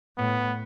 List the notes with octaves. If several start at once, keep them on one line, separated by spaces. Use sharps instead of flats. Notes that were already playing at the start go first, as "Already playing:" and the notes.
A2 B3